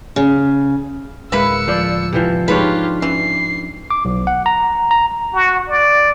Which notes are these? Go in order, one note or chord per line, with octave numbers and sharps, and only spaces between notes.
C#3
D1 G#3 A#3 E4 B4 E6 C#7
F3 D5
C3 E3 F3
G#2 D4 F4 G4 B4 C#5
E3 C#4 C7
D6
B1
F#5
A#5
A#5
F#4
D5